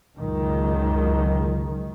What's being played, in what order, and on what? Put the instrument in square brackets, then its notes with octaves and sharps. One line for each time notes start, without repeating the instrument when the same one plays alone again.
[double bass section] C#2 F#2 D#3